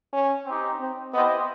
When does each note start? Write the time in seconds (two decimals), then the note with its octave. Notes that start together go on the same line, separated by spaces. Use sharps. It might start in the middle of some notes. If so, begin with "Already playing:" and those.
0.13 C#4
0.46 C4 D#4 G4
0.80 C4
1.13 B3 E4 G4 C5 D#5